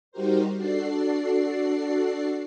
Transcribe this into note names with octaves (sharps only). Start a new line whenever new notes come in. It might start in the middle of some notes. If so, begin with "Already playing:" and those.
G3 D#4 F#4 G4 A#4 C5
D4 F#4 A4 D5 C7